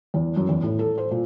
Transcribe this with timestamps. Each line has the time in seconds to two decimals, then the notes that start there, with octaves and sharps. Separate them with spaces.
0.14 E2
0.36 F#2
0.49 E2
0.63 A2
0.79 A4
0.98 C5
1.11 A#2